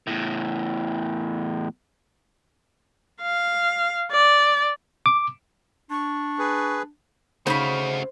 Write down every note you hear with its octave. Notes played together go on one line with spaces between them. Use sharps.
E2 A2
F5
D5
D6
D4 C#6
G#4 B4
C#3 A3 D#4 F#4 C5 F5 B5